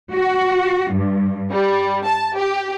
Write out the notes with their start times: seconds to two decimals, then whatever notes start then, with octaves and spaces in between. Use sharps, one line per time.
0.13 F#4
0.93 G2
1.51 G3
2.05 A5
2.37 G4